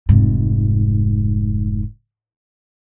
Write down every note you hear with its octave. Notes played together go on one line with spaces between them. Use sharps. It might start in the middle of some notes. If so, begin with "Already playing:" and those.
F1 G#2